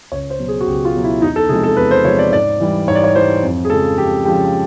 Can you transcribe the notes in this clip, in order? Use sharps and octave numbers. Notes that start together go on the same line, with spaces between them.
C#2 C#5
C5
B2 F#3
G#4
F#4
C#2 G4
F4
B2 F#3
E4
E2 D#4
A4
C3 F3 G#3 G#4
A4
E2 B4
C5
C3 F3 G#3 C#5
D5
G#2 D5
E3 G3
G#2 C#5
D5
C#5
E3 G3 C5
F2
G#4
C#3 F3 G#3 A4
F2 G4
C#3 F3 G#3 G4